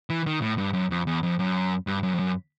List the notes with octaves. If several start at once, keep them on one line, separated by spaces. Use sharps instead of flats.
E3
D#3
A2
G2
F#2
F2
E2
F2
F#2
G2
F#2
F2
F#2